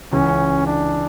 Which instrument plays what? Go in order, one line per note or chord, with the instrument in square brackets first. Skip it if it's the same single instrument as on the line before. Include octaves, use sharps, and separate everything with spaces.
[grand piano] C#2 C#3 E3 [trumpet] C#4
[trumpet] D4